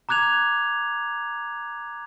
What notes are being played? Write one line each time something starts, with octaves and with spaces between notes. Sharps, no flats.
A#5 D6 F#6 G#6 F7